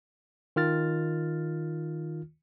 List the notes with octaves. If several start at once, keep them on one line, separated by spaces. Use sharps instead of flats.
D#3 F4 F6 A6